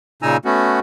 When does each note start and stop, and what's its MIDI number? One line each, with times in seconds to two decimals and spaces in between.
0.22 0.37 46
0.22 0.37 49
0.22 0.37 63
0.22 0.37 80
0.22 0.37 82
0.22 0.37 88
0.45 0.80 57
0.45 0.80 59
0.45 0.80 61
0.45 0.80 66